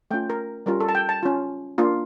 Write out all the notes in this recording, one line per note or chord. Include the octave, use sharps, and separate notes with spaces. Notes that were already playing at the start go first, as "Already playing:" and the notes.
A3 C#4 F4 G5
A#4
G3 C#4 F4 A#4
A4
A5
G5
A5
C#4 F4
A#3 D4 F4